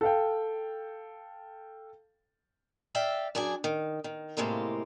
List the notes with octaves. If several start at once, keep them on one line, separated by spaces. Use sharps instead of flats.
A4 F5 G5
D5 E5 F5 G5
F#2 D4 G#4 D5 G#5
D#3
D#3
A2 C3 G#3 A#3 F4